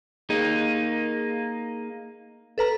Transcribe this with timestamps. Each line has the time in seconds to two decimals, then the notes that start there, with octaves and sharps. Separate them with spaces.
0.30 A#3 D#4 G#4
2.58 A4 B4 A#5